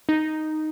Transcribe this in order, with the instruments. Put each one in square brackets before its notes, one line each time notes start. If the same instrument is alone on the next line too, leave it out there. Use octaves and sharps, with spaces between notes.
[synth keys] D#4